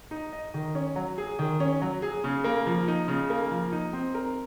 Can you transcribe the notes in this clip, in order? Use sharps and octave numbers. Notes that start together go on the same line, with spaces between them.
D#4
D#5
D#3
C#4
F#3
G#4
D#3
C#4
F#3
G#4
C#3
A#3
F3
D#4
C#3
A#3
F3
D#4
C4
A#4